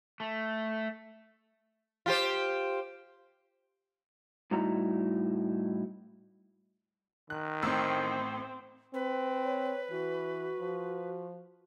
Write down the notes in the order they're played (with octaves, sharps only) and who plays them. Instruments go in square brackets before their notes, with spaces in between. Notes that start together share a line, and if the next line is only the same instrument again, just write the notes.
[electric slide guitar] A3
[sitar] F4 G4 C5
[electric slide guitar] A2 G3 D#4 E4 F#4 A#5
[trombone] D#3 [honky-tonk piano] F#6
[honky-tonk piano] A1 A2 E6 [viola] C4
[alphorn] C4 [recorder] B4
[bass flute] C#5
[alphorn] E3 [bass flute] F#4
[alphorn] F3